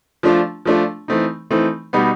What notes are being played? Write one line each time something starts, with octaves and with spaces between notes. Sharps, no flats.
F3 A3 D4 F4
F3 A3 D4 F4
E3 A3 C4 D#4
E3 A3 C4 D#4
B2 G3 B3 D#4